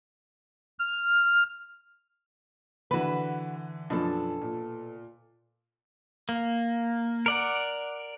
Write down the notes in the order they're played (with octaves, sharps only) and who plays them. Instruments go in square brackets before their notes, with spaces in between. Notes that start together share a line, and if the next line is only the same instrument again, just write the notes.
[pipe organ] F6
[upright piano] D3 E3 [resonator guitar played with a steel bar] F#4 B4
[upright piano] F#2 F3 D4 [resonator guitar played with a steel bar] B2 A4
[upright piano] A#2
[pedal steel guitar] A#3
A#4 D5 F#5